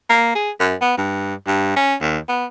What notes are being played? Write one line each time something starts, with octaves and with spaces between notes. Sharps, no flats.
A#3
G#4
F#2
B3
G2
G2
C#4
D#2
B3